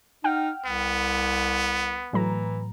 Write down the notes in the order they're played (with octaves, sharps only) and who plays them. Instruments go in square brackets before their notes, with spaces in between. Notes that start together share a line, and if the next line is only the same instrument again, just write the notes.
[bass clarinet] D#4 [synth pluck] F#5 G5 F6
[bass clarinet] C2 [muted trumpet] B3
[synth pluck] A2 F#3 A#5 [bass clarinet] E3